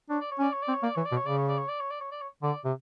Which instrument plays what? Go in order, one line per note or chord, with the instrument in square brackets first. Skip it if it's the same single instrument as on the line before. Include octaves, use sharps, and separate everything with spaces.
[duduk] D4 [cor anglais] C#5
[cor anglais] D5
C#5
[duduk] C#4 [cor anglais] D5
[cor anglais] C#5
D5
[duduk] C4
[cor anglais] C#5
[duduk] A#3 [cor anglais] D5
[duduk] E3 [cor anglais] C#5
[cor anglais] D5
[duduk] B2
[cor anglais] C#5
[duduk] C#3 [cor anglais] D5
[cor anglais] C#5
D5
C#5
D5
C#5
D5
C#5
D5
C#5
[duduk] D3 [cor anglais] D5
[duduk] C3